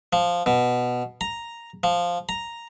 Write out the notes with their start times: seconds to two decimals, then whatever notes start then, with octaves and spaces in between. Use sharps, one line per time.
0.13 F3
0.46 B2
1.21 A#5
1.83 F3
2.29 A#5